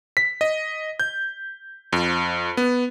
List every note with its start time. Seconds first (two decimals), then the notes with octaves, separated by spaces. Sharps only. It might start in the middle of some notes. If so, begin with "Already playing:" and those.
0.17 B6
0.41 D#5
1.00 G6
1.93 F2
2.57 B3